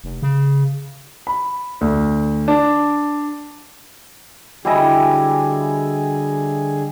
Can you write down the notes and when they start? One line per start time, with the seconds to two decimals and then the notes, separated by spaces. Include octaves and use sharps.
0.04 F1
0.22 C#3
1.27 B5
1.81 D2
2.48 D4
4.65 D3 G3 E4 F#4 G#4 D#5 G#5